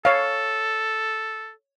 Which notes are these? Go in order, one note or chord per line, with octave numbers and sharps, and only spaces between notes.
A4 C#5 F5